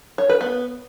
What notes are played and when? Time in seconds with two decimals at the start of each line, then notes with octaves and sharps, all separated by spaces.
0.18 C#5
0.29 B4
0.41 B3